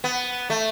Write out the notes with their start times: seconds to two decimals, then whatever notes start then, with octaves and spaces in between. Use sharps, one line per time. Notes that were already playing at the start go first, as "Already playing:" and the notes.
0.04 B3
0.50 A3